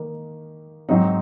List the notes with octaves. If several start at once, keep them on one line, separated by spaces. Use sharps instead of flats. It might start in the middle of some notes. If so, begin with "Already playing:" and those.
Already playing: D#3 A#3 D#4
G#2 F#3 C4 D#4